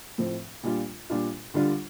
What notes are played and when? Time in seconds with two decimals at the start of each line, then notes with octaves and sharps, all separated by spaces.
0.18 A2 F3 C4
0.63 A#2 G3 D4 F4
1.10 A#2 G3 D4 F4
1.54 D3 G3 D4 F4